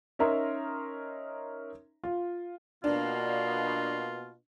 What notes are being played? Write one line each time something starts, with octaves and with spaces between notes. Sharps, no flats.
C#4 D#4 A#4 E5 A#5 C6
F4
B2 A#3 D4 F4